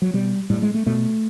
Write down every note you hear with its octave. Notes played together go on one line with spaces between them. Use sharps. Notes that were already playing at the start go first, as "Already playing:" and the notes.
F#3
B2 G3
A2 G3
G#3
A3
B2 A3